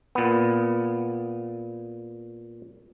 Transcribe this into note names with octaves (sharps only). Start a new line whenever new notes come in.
A#2 B3